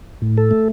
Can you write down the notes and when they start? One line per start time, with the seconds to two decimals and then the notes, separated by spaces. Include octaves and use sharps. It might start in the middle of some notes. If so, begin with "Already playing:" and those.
0.22 A2
0.38 A4
0.51 A3